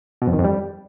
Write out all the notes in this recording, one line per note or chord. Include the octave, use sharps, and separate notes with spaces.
B2
F2
D#3
F2
G3